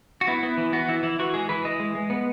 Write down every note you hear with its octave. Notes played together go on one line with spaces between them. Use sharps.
F#4
B3 E4
B3
E3
B3 F#4
E3 E4
E3 E4
E3 F#4
G#3 G#4
E3 B4
E3 D#5
G#3
G#3
B3